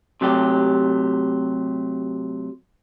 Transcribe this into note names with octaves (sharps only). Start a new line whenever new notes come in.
C3 F#3 A3 G4